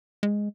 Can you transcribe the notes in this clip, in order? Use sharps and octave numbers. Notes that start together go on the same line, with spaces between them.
G#3